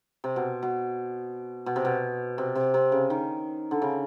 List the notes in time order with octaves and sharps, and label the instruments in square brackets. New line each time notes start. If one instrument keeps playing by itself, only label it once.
[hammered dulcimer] C3
B2
B2
B2
C3
B2
C3
C3
C3
C#3
D#3
D3
C#3